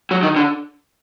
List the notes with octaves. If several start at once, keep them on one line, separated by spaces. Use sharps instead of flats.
F#3
D#3
D3